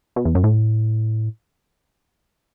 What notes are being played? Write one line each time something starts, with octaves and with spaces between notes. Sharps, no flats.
B2
E2
F#2
A2